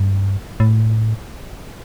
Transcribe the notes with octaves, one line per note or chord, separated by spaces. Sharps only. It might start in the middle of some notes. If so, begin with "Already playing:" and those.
Already playing: G2
A2